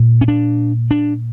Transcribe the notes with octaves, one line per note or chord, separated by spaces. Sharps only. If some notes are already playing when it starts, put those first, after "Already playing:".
Already playing: A#2
C#4
D4
D4